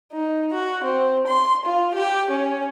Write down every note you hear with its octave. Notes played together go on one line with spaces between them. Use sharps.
D#4
F#4
C4
C6
F4
G4
C#4